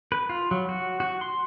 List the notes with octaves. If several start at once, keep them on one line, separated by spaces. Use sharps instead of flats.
B4
F4
F#3
F#4
F#4
C6